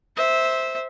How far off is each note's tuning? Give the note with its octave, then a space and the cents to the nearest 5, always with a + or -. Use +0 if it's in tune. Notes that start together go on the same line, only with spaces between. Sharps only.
C5 +0 E5 -15